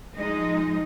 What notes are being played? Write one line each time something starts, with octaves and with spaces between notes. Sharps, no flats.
F3 G#3 D#4 G#4 D#5